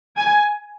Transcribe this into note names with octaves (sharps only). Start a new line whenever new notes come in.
G#5